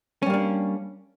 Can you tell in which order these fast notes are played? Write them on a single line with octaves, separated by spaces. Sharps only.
C#4 G3 A#3 D4